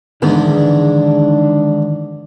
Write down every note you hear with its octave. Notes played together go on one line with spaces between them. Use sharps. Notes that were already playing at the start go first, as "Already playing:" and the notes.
E2 G#2 D3 D#3 B3 D4